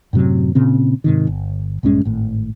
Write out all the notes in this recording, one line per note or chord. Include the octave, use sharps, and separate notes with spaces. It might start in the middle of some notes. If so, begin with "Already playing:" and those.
F#2 A2 C3 F#3
A#2 C#3 C4
G#2 C3 D#3
G1
A#1 G2 G#3 C#4
G#1 A2